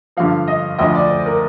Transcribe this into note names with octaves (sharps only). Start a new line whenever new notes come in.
G2 D3 F3 F5
D#5
D2 D3 F3 D#5
D5
C5
A#4